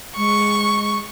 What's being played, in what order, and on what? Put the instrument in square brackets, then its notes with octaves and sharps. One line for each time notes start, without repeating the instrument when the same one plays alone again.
[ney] G#3 [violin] C#6